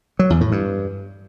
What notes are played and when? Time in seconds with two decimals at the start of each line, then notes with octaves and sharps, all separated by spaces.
0.19 F#3
0.30 E2
0.41 A2
0.52 G2